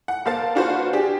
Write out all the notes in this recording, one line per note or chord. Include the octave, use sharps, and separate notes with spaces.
F#5
A#3 C5 F5 A5 A6
D4 F4 F#4 B4 C5
D4 G4 G#4